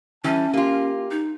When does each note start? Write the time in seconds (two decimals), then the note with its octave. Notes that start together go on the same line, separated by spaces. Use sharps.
0.24 E3 G3 C#4 A5
0.53 A#3 F4 G4
1.11 D#4